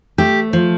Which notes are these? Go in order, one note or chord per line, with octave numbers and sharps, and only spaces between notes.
A3 G4
F3